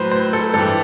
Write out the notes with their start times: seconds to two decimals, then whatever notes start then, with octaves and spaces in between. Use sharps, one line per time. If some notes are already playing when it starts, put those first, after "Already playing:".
Already playing: A2 F#3 B4 C5
0.11 C5
0.33 A4
0.54 G2 E3 G3 A4